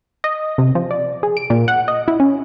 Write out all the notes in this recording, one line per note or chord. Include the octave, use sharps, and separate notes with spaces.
D#5
C3
F3
D5
G#4
D7
A#2
F#5
D#5
E4
C#4